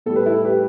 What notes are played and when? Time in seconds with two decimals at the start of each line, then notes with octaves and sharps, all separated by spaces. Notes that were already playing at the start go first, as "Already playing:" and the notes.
0.06 A2 G3 A4
0.16 B4
0.26 E4 A4
0.45 G4 B4